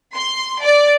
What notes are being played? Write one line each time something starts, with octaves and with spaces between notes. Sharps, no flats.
C6
D5